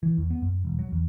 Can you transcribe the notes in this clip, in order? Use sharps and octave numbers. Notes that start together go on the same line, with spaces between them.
E3
E2
B3
F#2
E1
F#3
E2